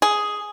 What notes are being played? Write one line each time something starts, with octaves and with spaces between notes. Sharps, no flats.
G#4